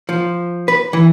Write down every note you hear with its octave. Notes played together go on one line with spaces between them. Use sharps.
F3
B4
E3